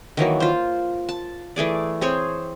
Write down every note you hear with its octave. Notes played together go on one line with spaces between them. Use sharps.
D#3 E3 F#3 A#3
F4 C5
A5
E3 A3 G#4 D5
C4 G#4 C5 C#5